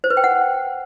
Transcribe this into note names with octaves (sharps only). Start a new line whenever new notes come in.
C5
B4
G5
F#5